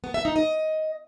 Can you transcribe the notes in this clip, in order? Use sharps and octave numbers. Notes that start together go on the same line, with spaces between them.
B3
E5
D#4
D#5